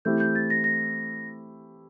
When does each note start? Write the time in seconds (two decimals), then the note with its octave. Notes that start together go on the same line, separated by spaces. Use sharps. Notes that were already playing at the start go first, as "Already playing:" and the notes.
0.05 E3 A3 C4 E4 G4 G6
0.20 G6
0.35 A6
0.50 A#6
0.64 A#6